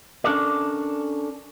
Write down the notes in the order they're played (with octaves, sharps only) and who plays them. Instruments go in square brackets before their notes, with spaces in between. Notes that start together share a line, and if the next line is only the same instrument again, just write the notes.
[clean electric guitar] C#4 D4 A4 A#4 D5